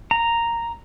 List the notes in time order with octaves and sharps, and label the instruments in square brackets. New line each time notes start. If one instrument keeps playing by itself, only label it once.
[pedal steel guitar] A#5